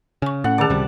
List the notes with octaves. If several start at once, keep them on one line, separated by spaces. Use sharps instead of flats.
C#3 G#5 C#6
A2 C#4 F#5
D3 D#3 G#4 D5 A5
C#2 C3 G3